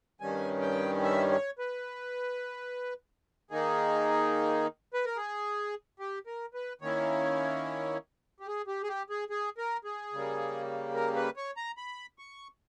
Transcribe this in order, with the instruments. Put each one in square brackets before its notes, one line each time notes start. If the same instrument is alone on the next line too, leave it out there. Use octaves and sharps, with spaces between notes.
[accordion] G2 D#3 G3 C#4 G#5
G5
E5
C#5
B4
D#3 A#3 D#4 G#4
B4
A#4
G#4
G4
A#4
B4
D#3 A#3 C#4 E4 C#5
G4
G#4
G4
G#4
G4
G#4
G#4
A#4
G#4
C#3 G3 A#3
A#4
B4
C#5
A#5
B5
C#6